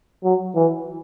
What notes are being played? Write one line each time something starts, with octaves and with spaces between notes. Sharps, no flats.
F#3
E3